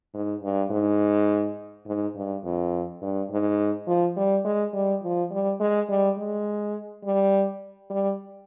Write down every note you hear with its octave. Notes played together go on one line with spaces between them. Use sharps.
G#2
G2
G#2
G#2
G2
F2
G2
G#2
F3
G3
G#3
G3
F3
G3
G#3
G3
G#3
G3
G3